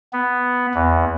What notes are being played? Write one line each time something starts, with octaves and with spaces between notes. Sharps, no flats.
B3
E2